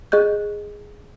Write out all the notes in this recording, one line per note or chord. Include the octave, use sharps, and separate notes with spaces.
G#4 D#5 F#6 G6